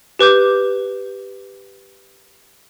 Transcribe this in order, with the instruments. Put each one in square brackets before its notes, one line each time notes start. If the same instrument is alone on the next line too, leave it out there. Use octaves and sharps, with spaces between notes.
[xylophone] G4 B4 D6 G6